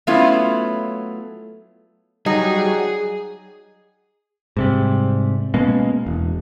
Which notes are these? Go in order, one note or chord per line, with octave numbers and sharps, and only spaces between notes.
F#3 A3 B3 C#4 E4 F4
F#3 G3 D#4 G#4 G#5
G#2 C3 G3
B2 G#3 A#3 C#4
E1